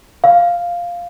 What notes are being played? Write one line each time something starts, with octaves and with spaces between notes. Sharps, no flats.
F5